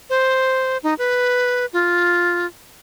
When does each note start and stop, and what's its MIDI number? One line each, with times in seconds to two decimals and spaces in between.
0.10 0.78 72
0.83 0.94 63
0.98 1.66 71
1.73 2.46 65